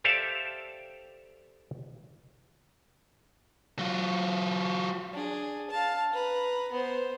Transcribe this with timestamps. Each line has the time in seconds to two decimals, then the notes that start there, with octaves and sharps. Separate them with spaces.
0.04 G4 A4 C5 D5 E5 F5
3.79 F#3 F4
5.13 D4 G#4
5.70 F5 A5
6.12 B4 A#5
6.72 B3 C5